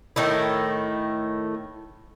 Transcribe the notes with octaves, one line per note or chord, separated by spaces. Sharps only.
A2 D#3 A3 E4